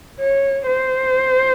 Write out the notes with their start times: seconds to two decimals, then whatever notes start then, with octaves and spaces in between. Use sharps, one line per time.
0.19 C#5
0.67 C5